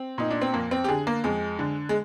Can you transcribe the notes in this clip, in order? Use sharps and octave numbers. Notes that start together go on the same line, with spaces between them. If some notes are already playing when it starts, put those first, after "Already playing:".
Already playing: C4
A#2 D#4
D4
C4
F2 A#3
C4
G4
D3 G#4
A#3
F2 G#3
D3
G#3